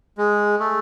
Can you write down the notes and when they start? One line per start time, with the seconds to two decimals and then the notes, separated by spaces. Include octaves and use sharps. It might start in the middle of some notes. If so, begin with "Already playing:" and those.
0.18 G#3
0.60 A3